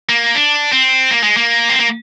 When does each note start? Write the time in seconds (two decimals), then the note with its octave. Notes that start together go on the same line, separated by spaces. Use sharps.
0.09 A#3
0.35 D4
0.72 C4
1.11 A#3
1.23 G#3
1.37 A#3
1.69 C4
1.79 A#3